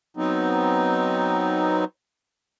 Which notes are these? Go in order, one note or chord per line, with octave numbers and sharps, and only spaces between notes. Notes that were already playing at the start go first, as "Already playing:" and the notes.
F#3 B3 C4 D#4